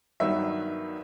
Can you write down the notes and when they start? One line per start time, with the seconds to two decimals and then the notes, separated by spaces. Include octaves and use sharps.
0.20 G2 D#3 F#3 B3 E5